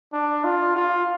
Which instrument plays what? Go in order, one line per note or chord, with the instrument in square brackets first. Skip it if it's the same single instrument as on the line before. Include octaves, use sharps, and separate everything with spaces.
[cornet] D4
F4
F4